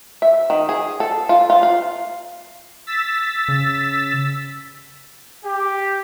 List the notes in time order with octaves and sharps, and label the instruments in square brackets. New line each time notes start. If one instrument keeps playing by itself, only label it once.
[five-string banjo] E5
D#3
G#4
A4
F4
F4
F5
[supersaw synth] E6 A6 B6
[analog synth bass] C#3
[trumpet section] G4